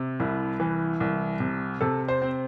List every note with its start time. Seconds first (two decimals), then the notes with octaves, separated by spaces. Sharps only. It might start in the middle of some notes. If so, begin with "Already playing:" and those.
Already playing: C3
0.20 C2 E4
0.60 E3
1.00 C2
1.40 C3
1.81 C3 A4
2.08 C5
2.22 C4